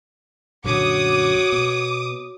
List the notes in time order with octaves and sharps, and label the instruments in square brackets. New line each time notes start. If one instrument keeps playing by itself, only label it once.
[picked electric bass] A#1 F#2 D3 [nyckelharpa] F#4 C#5 [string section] D6 D#6
[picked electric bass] B2